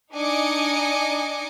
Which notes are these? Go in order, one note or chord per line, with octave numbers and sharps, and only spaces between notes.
D4 D#4 D#5 G#5 D6 C#7